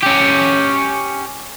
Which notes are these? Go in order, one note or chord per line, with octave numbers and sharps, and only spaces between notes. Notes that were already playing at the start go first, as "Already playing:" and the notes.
C#4 G4